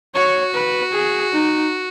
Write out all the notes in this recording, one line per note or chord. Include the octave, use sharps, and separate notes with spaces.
F#4 C#5
B4
G#4
D#4